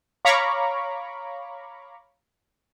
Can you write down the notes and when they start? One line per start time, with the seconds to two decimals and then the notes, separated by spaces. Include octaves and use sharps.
0.25 C#5 F5 A#5 B5 C#6 D6